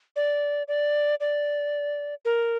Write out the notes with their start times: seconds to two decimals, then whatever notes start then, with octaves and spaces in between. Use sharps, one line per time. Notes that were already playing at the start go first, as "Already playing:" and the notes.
0.16 D5
0.68 D5
1.20 D5
2.25 A#4